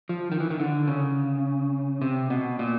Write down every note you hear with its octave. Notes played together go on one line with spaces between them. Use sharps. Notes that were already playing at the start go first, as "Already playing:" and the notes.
F3
D#3
E3
D#3
D3
C#3
C3
B2
A#2